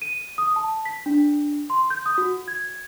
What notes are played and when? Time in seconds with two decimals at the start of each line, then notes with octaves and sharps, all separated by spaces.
0.02 D#7
0.38 D#6
0.56 A5
0.85 B6
1.06 D4
1.70 C6
1.90 G6
2.06 D#6
2.18 F#4
2.48 G#6